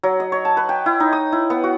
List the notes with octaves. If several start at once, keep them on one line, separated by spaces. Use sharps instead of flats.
F#3
D#5
C#5
A5
B4
G5
E4
D#4
D#6
E4
B3
F#4